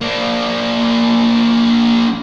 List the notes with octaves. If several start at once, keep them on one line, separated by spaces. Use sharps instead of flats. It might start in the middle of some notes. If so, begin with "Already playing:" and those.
A#3 D4